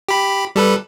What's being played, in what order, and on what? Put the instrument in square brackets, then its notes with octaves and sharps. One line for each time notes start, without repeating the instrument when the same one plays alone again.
[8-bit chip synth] G4 B5
G3 A4 B4